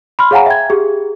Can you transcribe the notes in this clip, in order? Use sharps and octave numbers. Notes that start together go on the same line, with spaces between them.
B5 C6 F6
G#4 C#5 F5 F#5 G#5 A#5
E5 G5 G#6
G4 G#4